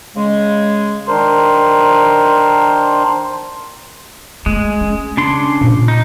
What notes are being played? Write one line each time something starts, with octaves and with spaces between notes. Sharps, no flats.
C#3 G#3
D#3 D4 A#4 C5 C6
G#3 A3
C#4
C#3 D4 C6
A#2
D#4